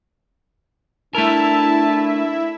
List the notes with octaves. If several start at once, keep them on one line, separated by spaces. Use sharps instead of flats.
A3 D4 E4 A#4 E5 A5